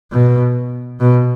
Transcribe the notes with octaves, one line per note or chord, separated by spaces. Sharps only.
B2
B2